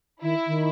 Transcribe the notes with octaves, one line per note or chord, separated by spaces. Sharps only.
D#3 E4
D#3